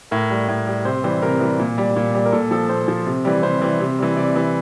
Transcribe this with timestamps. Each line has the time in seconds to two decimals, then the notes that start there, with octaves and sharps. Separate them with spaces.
0.11 A2 A#4
0.30 G3
0.48 A2
0.67 G3
0.85 C3 C5
1.04 E3 G3 C5
1.22 C3 A#4
1.40 E3 G3
1.59 A#2
1.78 G3
1.96 A#2
2.15 G3
2.26 A#4
2.32 A#2 A4
2.51 F3 A4
2.69 A#2 C5
2.88 F3
3.07 C3
3.25 E3 G3
3.43 C3 C5
3.62 E3 G3
3.80 C3
3.99 E3 G3
4.17 C3 D5
4.36 E3 G3